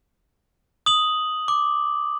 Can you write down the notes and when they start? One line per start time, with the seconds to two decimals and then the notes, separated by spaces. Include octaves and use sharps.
0.86 D#6 F#7
1.48 D6